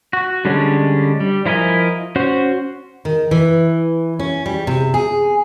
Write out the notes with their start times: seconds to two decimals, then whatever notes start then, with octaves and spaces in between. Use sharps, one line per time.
0.13 F#4
0.45 D3 G3 G#3 C#4 D4
1.20 G3
1.46 F3 E4 A#4 D#5 G#5
2.16 C#4 F#4 C5
3.05 D#3
3.31 E3
4.19 C#4
4.46 G3
4.67 C3
4.94 G#4